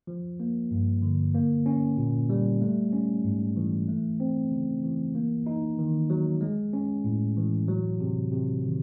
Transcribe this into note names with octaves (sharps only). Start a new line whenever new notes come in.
F3
A#3
G2
D3
A#3
C#4
A#2
G3
A3
C#4
G#2
E3
A3
C4
C#3
E3
A#3
D#4
D#3
F#3
G#3
C#4
A2
E3
F#3
C3
C3
D#3